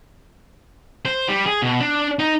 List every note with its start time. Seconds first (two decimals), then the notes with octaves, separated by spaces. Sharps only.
1.05 C5
1.28 G3
1.46 G#4
1.62 B2
1.80 D4
2.19 D#4